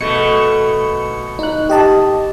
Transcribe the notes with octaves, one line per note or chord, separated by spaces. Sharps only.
B2 A3 C#7
D#4 F#6
G4 D#5 A5